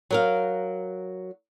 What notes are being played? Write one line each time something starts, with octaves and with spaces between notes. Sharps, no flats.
F#3 A#4 F5